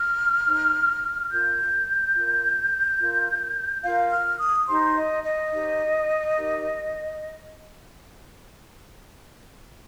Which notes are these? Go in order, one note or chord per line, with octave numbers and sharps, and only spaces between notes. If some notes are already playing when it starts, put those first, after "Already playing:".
Already playing: F6
D#4 C5
F4 A#4 G6
F4 A#4
F4 A#4
F4 A#4 F5
F6
D#6
D#4 G4 C5 C6
D#5
D#5
D#4 G4 C5
D#4 G4 A#4